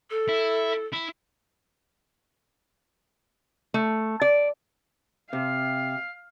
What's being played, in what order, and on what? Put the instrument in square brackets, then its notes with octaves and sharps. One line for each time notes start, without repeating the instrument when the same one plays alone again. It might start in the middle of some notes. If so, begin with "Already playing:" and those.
[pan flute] A4
[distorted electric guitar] E4
E4
[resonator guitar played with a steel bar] A3
D5
[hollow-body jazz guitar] C3 [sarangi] F5